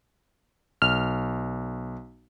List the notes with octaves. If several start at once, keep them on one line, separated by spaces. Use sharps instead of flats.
B1 F6